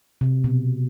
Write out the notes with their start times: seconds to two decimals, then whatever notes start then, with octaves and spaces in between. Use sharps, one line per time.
0.21 C3
0.44 B2